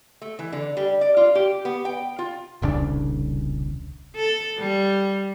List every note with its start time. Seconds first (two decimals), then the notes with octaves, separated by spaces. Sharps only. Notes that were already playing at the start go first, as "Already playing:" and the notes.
0.22 A3
0.39 E3
0.53 D3
0.77 G3
1.01 D5
1.17 F4
1.35 G4
1.65 B3
1.85 G5
2.19 F4
2.62 D#1 C2 C#3 D4
4.16 A4
4.59 G3